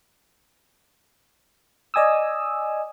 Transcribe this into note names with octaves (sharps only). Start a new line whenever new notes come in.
D5 D#5 G#5 D#6 E6